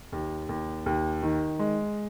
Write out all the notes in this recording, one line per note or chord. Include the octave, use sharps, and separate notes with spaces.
D#2
D#2
D#2
D#3
G#3